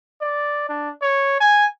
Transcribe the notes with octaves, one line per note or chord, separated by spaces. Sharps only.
D5
D4
C#5
G#5